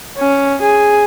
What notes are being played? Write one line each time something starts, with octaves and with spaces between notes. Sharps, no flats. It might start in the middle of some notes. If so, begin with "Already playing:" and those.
C#4
G#4